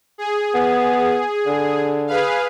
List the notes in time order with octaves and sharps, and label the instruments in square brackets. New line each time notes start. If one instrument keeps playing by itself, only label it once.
[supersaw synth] G#4
[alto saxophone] B3
D3
[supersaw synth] G#4 B4 F5